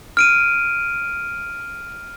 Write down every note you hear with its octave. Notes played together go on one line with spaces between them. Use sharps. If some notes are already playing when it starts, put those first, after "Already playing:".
F6 D7 D#7